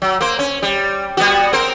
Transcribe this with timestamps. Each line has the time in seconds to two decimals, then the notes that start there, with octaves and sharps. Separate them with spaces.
0.02 F#3
0.21 A#3 C5
0.39 C#4
0.62 G3
1.17 G3 B3 F#4
1.53 C4 A#4 C5